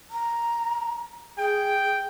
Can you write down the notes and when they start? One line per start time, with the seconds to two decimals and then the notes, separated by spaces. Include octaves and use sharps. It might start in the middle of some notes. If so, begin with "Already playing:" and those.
0.10 A#5
1.38 G#4 G5